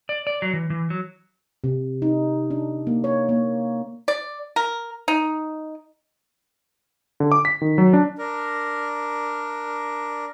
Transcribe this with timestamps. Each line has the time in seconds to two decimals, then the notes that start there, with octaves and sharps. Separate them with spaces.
0.09 D5
0.27 D5
0.42 F#3
0.53 E3
0.70 E3
0.90 F#3
1.64 C3
2.02 D#4
2.51 D4
2.87 A#3
3.04 C#5
3.29 A#3
4.08 D5
4.56 A#4
5.08 D#4
7.20 D3
7.32 D6
7.45 B6
7.62 D#3
7.78 F#3
7.93 D4
8.18 D4 A#4